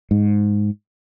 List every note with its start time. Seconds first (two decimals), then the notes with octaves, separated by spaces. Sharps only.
0.11 G#2